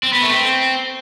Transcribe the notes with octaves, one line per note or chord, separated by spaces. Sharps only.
C4
B3
A3
C4